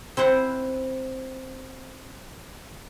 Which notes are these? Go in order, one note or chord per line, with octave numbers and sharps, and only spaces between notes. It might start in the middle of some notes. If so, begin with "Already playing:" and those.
C4 E4 C5 F#5